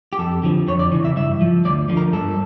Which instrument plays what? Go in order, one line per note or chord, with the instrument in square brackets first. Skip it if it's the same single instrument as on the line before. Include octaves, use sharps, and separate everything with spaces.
[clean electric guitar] G4
F2 A4
D3 F3
F2 C#5
D5
C#3 E3
E5
G2 E5
F3
D2 D5
D3 F3
A#4
G2 A4